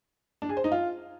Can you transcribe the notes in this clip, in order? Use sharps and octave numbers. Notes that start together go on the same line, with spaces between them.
D4
G#4
C5
D#4
F4